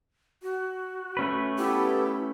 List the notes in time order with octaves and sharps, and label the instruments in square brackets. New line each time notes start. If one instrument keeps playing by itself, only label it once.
[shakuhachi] F#4
[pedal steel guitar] A3 C#4 B4
[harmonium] B3 G4 A4 [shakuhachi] E4